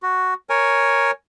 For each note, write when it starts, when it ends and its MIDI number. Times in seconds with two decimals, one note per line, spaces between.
0.03 0.34 66
0.50 1.11 70
0.50 1.11 73
0.50 1.11 80